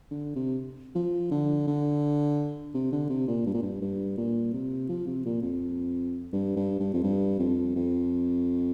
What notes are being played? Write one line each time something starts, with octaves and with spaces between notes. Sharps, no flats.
D3
C3
F3
D3
D3
C3
D3
C3
A#2
G2
A#2
G2
G2
A#2
C3
F3
C3
A#2
F2
G2
G2
G2
F2
G2
F2
F2